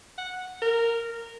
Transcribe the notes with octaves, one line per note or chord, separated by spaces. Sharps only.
F#5
A#4